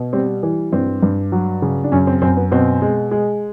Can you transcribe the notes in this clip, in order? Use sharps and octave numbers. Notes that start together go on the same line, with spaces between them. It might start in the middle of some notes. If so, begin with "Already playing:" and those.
Already playing: B2
G3 C4
E3
G2 C4
G2
F#3
C#3
D4
F#2 C#4
C4
F#2 C4
B3
B2 C4
G#3
G#3